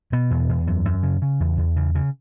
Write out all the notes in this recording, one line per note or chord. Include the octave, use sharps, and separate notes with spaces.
B2 B3
E2
E2
F#2
F#2
C#3
C#3
E2
E2
C#3
C#3